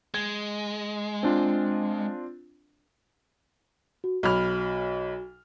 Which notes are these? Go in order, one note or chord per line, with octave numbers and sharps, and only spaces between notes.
G#3 G#6
C4 D4 F4
F#4
B1 F#4 B5 F6